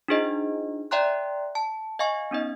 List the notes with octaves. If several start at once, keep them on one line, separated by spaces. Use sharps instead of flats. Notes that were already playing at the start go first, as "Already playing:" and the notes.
D4 D#4 F4 G#4 C5 D#5
D5 E5 G5 A#5 C6 F#6
A5
D#5 F5 G#5 C#6
B3 C#4 D#4 D#5